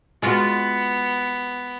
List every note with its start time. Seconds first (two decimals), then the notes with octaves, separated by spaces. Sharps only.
0.22 G#3 B3 F4 F#4